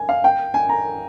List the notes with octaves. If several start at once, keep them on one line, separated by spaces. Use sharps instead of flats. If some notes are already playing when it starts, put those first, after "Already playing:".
Already playing: G#5
F5
G5
G#5
A#5